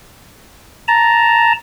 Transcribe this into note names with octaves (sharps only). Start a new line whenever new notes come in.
A5 A#5